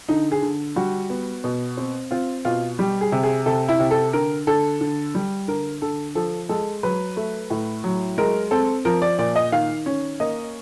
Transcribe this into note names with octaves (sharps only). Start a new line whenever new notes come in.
D3 D#4
G#4
D3
G3 F#4
B3
B2
C4
C4 F4
B2 F4
G3 G4
G#4
C3
G#4
C3 A4
E4
C3
A4
D3 A#4
D3 A4
D3
G3
D3 A#4
D3 A4
F3 A4
G#3 A4
F#3 B4
A3
A2
F#3
G#3 A#4
C4 A4
F3 A#4
D5
A#2 D5
D#5
D#3 F5
C#4
A#3 D#5